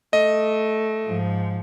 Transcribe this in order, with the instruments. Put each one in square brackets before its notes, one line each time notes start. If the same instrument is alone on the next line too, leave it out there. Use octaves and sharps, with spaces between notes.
[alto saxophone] A3 [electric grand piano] D#5
[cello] G#2 F3